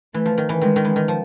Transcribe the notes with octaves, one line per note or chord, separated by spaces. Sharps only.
E3 A3
F3
D#3
E3
D#3 G#3
D#3
E3
D#3
F3